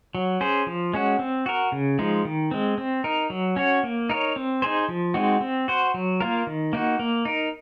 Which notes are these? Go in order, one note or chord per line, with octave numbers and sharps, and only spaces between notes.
F#3
C#4 G#4 C5
F3
G#3 C#4 F#4
C4
F#4 A#4
C#3
F3 G#3 D#4
D#3
G#3 C4
C4
D#4 A#4
F#3
C#4 F#4 C#5
A#3
D#4 A#4 C#5
C4
D#4 G#4 C5
F3
G#3 C4 D#4 F#4
C4
F#4 C5
F#3
A#3 F4 A#4
D#3
A#3 D#4 F#4
A#3
D#4 A#4